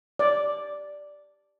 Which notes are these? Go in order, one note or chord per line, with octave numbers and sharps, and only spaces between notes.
D5